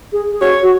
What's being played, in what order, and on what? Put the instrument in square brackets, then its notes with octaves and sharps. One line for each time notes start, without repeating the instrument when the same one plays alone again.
[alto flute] G#4
G#4
[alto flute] F#4 [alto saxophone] C#5
[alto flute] F#4